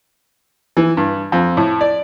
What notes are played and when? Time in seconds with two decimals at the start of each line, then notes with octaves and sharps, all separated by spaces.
0.77 E3
0.97 G2
1.32 F2
1.57 A2
1.81 D5